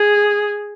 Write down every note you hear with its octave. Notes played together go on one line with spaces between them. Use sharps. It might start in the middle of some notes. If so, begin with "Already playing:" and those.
Already playing: G#4